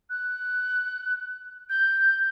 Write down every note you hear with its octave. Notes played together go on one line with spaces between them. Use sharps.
F#6
G6